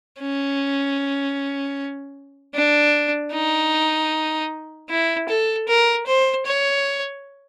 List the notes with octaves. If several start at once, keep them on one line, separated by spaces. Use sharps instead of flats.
C#4
D4
D#4
E4
A4
A#4
C5
C#5